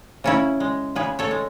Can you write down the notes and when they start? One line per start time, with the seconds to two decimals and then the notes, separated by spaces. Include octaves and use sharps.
0.24 C#3 C#4 E4
0.60 G#3
0.96 C#3 G#4 B4
1.19 A4 C#5
1.31 G#3